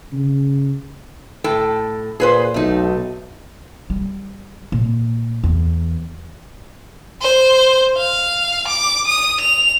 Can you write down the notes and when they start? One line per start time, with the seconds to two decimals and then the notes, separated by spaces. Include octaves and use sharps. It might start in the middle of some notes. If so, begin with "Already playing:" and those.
0.13 C#3
1.44 A2 A4 G5
2.20 A#2 G#4 B4 C5
2.54 B1 A3 D#4
3.90 G3
4.72 A#2
5.44 E2
7.22 C5
7.98 F5
8.68 D6
9.08 D#6
9.41 F7